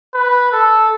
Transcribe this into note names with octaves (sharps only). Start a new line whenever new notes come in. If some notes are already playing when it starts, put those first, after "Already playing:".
B4
A4